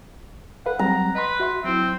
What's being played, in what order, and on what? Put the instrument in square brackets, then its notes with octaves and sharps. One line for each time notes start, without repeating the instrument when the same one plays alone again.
[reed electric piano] A4 B4 F5 [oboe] F#5
[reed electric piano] F#3 G3 C4 [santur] A#5
[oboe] B4 [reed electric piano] D#5 C6
[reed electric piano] F#4 E5 C6
[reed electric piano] F#3 E4 [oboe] C4